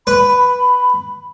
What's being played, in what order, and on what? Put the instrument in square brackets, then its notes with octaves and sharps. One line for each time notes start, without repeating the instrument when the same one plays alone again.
[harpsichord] B4 [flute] B5